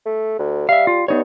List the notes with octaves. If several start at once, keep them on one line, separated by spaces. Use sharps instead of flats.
A3
D2
G3 E5 F5
F4
G2 B3 D#4 C#5